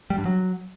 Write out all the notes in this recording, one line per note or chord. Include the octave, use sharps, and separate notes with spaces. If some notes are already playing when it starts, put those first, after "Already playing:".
G3
G2
F#3